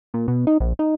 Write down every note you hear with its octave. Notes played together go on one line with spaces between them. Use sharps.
A#2
B2
D#4
A#1
D#4